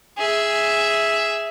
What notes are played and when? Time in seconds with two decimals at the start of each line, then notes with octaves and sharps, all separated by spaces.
0.18 G#4 E5